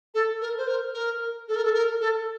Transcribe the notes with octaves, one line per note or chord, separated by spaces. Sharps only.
A4
A#4
C5
A#4
A#4
A4
A#4
A4
A#4
A4